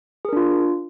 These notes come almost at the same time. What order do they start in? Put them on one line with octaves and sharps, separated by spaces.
G#4 A#4 D4 F4